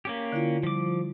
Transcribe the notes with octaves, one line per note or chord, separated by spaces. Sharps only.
A#3 C#4 G4
D3 E4 F4
F3 G3 D6